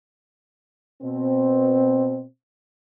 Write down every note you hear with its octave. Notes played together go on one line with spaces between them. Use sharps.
B2 C4